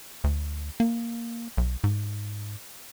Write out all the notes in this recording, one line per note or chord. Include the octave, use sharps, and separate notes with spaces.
D2
A#3
B1
G#2